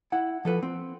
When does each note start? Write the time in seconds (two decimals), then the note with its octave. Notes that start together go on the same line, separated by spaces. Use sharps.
0.12 E4 F#5
0.45 F3 A4 B4
0.63 C4